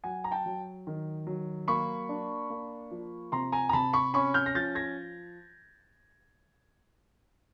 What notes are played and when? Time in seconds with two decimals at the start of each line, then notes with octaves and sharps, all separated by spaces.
0.04 F#3 F#5 G#5
0.24 A#5
0.31 G5 A5
0.46 F#3
0.87 D#3
1.27 F#3
1.68 A#3 B5 C#6
2.09 D4
2.50 A#3
2.91 F3
3.32 C3 A#5 C6
3.52 G#5 A#5
3.69 A#5
3.73 C3 A5 B5
3.93 B5 C#6
4.14 C#4 B5 C#6
4.34 F6 G6
4.46 A#6
4.55 F3 G6 A6
4.75 G#6 A#6